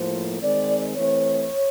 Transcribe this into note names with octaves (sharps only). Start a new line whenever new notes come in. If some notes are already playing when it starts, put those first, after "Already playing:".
Already playing: A2 F3 A#3 C5
D#3 G#3 C4 D5
E3 A3 C4 C#5